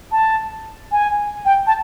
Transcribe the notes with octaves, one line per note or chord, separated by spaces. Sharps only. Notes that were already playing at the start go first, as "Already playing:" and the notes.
A5
G#5
G5
A5